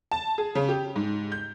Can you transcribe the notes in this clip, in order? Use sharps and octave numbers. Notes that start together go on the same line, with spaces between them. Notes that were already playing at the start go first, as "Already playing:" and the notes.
A5
G#4
C#3
G4
G#2
G6